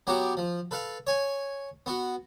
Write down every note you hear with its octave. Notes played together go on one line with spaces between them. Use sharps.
F#3 B3 F#4 G4 D6
F3
A4 B4 F5
C#5 G#5
B3 F#4